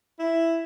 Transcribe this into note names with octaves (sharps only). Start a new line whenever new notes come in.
E4